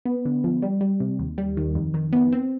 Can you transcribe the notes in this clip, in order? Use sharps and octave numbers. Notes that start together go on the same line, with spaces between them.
B3
D3
F3
G3
G3
C3
D#2
G3
D#3
F2
D#3
B3
C4